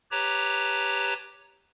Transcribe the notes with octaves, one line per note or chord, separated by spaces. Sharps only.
G4 B4 C#5 A5 A#5